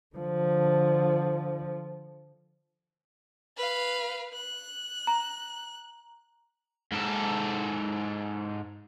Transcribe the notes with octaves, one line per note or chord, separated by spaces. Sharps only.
D3 F3
B4 F5
F#6
A#5
G#2 A4